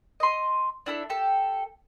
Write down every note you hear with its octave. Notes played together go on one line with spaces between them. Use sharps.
D#5 C6
D4 E4 A4
G4 A4